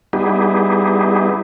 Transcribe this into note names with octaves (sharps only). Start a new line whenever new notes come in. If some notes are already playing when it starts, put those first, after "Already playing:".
G3 B3 D#4 E4 G4 G#4